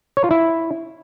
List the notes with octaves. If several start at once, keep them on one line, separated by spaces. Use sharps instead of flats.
C#5
F4
E4